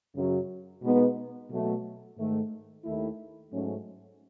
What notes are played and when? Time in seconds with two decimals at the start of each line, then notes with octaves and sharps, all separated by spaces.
0.14 F#2 C#3 F#3
0.81 B2 G#3 B3 D#4
1.50 B2 F#3 A3
2.16 G#2 D#3 A3
2.85 D#2 D#3 A3 E4
3.51 G#2 F#3 A3 C#4